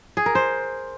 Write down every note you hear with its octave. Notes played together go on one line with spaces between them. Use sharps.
G#4
A#4
C5